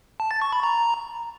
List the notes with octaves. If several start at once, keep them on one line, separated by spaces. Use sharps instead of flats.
A5
A6
C#6
B5
A#5